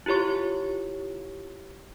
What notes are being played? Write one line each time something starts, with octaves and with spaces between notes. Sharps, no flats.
E4 F4 G4 C#5 C#6